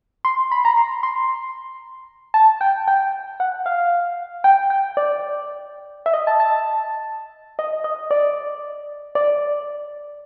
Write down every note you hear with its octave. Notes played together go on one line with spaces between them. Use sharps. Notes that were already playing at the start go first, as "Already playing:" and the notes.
C6
B5
A#5
C6
C6
A5
G5
G5
F#5
F5
G5
G5
D5
E5
D#5
A5
A5
D#5
D#5
D5
D5